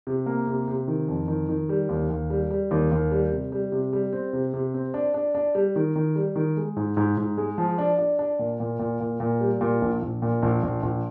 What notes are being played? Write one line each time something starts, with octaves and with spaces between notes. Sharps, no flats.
C3
A#3
C3
C3
D#3
F2
D#3
D#3
G3
D#2
D#2
G3
G3
D#2
D#2
G3
C3
G3
C3
G3
C4
C3
C3
C4
D4
D4
D4
G3
D#3
D#3
G3
D#3
G#3
G#2
G#2
G#2
G#3
F3
D4
D4
D4
A#2
A#2
A#2
A#2
A#2
G3
A#2
A#1
A#1
A#2
A#1
A#1
A#1